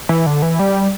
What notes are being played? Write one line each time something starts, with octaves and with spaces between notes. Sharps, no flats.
E3
D3
E3
G3